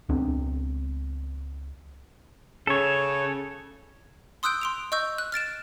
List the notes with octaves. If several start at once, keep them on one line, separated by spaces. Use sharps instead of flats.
C#2 B3 C4 D4
C#3 A4 C#5
C6 D#6 E6 F#6 G6 D7
C6 D7 F7
D#5 C#6 E6 G6
F#6
F6 A6 D7 E7